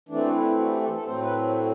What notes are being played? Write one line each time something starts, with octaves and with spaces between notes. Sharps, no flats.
E3 A3 C4 D4
F#4
E4
F#4
G4
A4
A4
A2 F#3 A3 C4 C5
B4